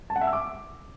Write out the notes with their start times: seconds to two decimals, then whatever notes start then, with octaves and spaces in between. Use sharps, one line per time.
0.10 A5
0.16 F#5
0.21 E5
0.27 E6
0.33 D6